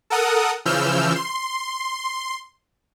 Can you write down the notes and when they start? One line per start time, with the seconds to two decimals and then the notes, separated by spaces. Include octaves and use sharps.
0.10 A4 A#4 F#5 D#6
0.65 C#3 E3 F3 E6 F6 G6
1.16 C6